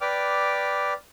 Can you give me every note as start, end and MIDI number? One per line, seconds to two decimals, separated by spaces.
0.01 0.93 71
0.01 0.93 74
0.01 0.93 79
0.01 0.93 86
0.01 0.93 89